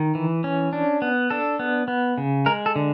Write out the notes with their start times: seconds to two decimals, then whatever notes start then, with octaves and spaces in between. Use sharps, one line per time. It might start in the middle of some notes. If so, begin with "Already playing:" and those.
Already playing: D#3
0.15 E3
0.44 C#4
0.73 D4
1.02 B3
1.30 D4 A4
1.59 B3
1.88 B3
2.18 C#3
2.46 G#3 A#4
2.66 A4
2.76 D3